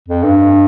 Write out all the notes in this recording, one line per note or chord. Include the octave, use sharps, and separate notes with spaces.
F2
G2